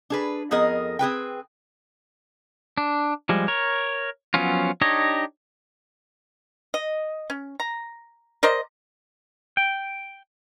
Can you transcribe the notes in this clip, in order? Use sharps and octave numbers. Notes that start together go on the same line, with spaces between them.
D4 G#4 B4
F2 B3 G#4 A#4 D#5
C4 G#4 B4 G5
D4
F3 G3 G#3
A#4 C#5
F3 F#3 B3 C#4 F4
D4 D#4 G4 C#5 D#5
D#5
C#4
A#5
A#4 C5 D5 D#5
G5